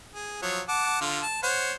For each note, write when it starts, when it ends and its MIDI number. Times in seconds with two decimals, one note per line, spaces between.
0.14 0.39 68
0.42 0.61 53
0.42 0.61 54
0.42 0.61 73
0.69 1.00 78
0.69 1.00 81
0.69 1.00 86
1.01 1.21 50
1.01 1.21 65
1.23 1.39 81
1.43 1.73 72
1.43 1.73 73
1.43 1.73 78